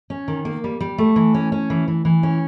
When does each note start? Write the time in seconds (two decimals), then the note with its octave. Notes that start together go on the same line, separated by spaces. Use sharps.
0.10 C#4
0.28 D#3
0.45 A#3
0.64 G3
0.80 G3
0.98 A3
1.16 E3
1.34 C#4
1.52 C#4
1.70 E3
1.88 E3
2.05 E3
2.23 C#4